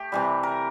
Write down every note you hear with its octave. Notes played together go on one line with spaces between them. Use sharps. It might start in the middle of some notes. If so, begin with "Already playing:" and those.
Already playing: A3 G4
C3 E3 G3
A#4